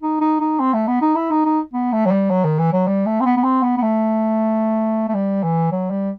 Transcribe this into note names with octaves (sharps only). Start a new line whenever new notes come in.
D#4
D#4
D#4
C4
A3
B3
D#4
E4
D#4
D#4
B3
A3
F#3
G3
F#3
D#3
E3
F#3
G3
A3
C4
B3
B3
C4
B3
B3
A3
A3
G3
E3
F#3
G3